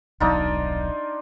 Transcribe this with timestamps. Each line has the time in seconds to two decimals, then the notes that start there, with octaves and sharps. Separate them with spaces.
0.20 D#1 B1 F#3 D4 D#4 F4